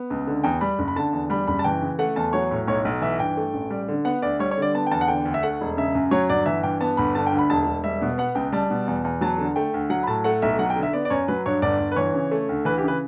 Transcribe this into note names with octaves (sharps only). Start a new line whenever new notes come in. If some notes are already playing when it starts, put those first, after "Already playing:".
Already playing: B3
C#2
D3
E2 G5
G3 B5
F#1
B5
D3 A5
E2
G3 B5
F#1 B5
A5
E3 G5
C#3
A3 F#5
E2 A5
F#3 C#5
A2
B1 C#5
B1
E3 E5
G2 G5
A3
A1
G3
D3
B3 F#5
D2 D5
G3 C#5
C#5
D3 D5
B3 A5
G5
E2 A5
F#5
D3 G5
D2
E5
A3 F#5
E1
C#3 E5
F#2
F#3 C#5
G1 D5
E3 E5
G2 G5
B3 A5
G1 B5
D3 A5
G5
D2
B5
E1 A5
E1
G3 E5
B2
B3 F#5
C#2 G5
G3 A5
B2
E2
E2
F#3 A5
D3
A3 G5
D2
F#3 F#5
B5
A2 A5
A3 F#5
B1 E5
F#3 F#5
G5
D3
E5
B3 D5
D5
F#2 C#5
F#3 B4
G2 C#5
G1 D5
G1
B4
E3 C#5
C#3
A3
D2
E3 B4
G4
C#3 B4